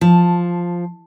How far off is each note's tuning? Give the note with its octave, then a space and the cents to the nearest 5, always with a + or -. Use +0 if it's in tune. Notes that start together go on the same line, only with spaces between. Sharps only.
F3 +0 A5 +0